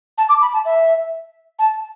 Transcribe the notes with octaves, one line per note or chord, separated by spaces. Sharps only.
A5
D6
B5
A5
E5
A5